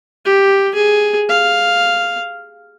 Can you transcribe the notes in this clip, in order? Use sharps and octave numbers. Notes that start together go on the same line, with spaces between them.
G4
G#4
F5